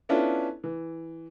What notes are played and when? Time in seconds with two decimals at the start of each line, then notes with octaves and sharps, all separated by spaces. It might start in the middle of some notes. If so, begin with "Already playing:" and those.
0.09 B3 C#4 D4 E4 F4 A4
0.64 E3